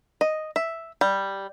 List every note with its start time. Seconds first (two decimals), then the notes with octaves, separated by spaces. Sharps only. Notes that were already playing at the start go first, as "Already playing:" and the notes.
0.21 D#5
0.56 E5
1.01 G3